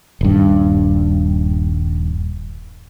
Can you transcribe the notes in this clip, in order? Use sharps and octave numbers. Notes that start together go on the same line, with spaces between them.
D#1 G2